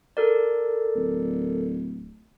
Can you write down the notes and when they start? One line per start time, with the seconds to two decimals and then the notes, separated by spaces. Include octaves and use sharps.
0.17 A4 A#4 D5
0.96 D1